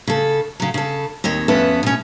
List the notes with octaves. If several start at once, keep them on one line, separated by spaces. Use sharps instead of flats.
C#3 A4
C#3 F#3
C#3 A4
D#2 C4 C#5 D#5
F2 B3 C#4 B4 E5 A5
B2 C#4